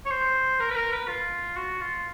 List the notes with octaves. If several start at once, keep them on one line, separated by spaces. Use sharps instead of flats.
C#5
C5
A#4
B4
A#4
B4
F4
F#4
F4